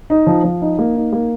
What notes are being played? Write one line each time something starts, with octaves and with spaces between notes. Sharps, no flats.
D#4
F3
F3
D#4
A#3
D#4
A#3